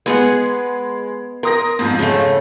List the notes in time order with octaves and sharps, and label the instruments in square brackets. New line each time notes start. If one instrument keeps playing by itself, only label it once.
[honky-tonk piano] G#3 [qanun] B3 G#4 F#5
[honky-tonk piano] A#4 D#6 A#6 [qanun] C6
[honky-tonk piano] F2 G#2
[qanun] C#3 A3